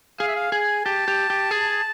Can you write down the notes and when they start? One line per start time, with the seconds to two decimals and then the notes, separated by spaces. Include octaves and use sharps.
0.20 G#4 F5
0.27 E5
0.36 F5
0.52 G#4 G#5
0.86 G4 A5
1.08 G4
1.30 G4
1.51 G#4